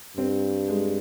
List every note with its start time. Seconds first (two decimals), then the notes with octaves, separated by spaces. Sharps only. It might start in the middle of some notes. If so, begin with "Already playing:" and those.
0.17 G2 C4
0.69 G#3